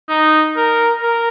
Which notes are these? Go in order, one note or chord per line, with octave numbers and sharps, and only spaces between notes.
D#4
A#4
A#4